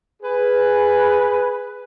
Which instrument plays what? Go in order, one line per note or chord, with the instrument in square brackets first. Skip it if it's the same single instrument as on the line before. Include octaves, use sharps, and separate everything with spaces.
[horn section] G#4 B4